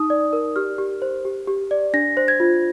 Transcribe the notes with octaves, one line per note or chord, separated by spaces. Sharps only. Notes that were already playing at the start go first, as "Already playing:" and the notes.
Already playing: D#4 D#6
D5
A#4
G4 F6
G4
C5
G4
G4
D5
D4 A#6
C5
G#6
F4